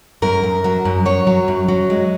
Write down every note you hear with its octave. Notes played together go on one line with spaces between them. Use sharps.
F#2 A#4
F#2
F#3
F#2
F#3 C#5
F#3
F#2
F#3
G#3